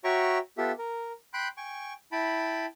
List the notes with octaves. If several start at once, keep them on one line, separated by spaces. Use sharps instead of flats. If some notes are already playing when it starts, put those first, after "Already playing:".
F#4 C#5 E5 G5 A#5 C#6
B3 F4 G4 A4 E5
A#4
G5 B5 C6 F#6 G6
G5 G#5 C#6
E4 G5 A5 B5